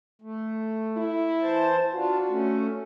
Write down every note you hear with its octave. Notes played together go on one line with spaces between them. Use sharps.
A3
E4
E3 C5 A5
D4 F4 F#4
A3 C#4